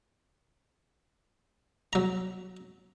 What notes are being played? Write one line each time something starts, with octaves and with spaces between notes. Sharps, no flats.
F#3 A#5